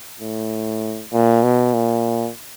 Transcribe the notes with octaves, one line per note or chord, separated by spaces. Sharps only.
A2
A#2
B2
A#2